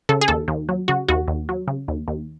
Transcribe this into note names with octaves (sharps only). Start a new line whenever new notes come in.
C#3 A4
G#4
D#2 A4
D#2
F#3
C#3 F#4
D#2 F#4
D#2
F#3
C#3
D#2
D#2